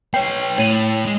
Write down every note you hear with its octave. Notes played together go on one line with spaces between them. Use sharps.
B3 C#5 G5 C7
A2 C#5 D#7 F#7
G#3